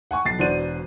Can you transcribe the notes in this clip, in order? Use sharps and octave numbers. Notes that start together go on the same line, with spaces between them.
F#5 G#5 C#6
B1 A6 C7
E1 D4 F#4 C5 D5 D#7